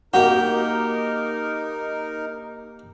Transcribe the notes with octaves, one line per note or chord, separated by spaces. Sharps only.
A#3 D#4 F#4 G4 A#4